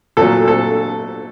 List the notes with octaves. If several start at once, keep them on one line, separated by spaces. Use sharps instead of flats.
A#2 F#3 A4
A4